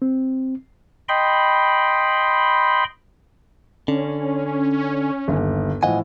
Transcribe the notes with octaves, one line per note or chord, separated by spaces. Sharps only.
C4
D#5 G5 B5 C6
D3 C#4
G1 D#2
A2 E3 F3 D#5 F#5 G#5